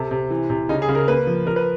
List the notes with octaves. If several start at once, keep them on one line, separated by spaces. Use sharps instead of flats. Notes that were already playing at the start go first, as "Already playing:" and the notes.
Already playing: C3 A4
C3
E3
C3
C#3 D#4
G#4
C#3
A#4
A#3 B4
F3
F3 A#4
B4